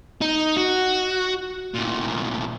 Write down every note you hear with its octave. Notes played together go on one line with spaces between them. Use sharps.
D#4
F#4
D2 A#2